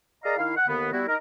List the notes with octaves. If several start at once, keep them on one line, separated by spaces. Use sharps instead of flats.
G#4 A#4 D5 D#5 F5 A#5
D#3 E4 F5
F#5
D#2 D3 B3
G3 B3 E4 F#4
D#4 A#4